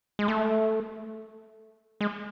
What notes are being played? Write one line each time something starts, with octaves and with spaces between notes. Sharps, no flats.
G#3
A3
G#3